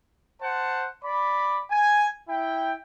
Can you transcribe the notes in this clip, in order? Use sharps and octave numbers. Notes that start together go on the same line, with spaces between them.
C5 F#5 A5
D5 B5
G#5
E4 G5